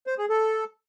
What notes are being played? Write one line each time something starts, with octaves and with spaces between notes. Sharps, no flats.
C5
G#4
A4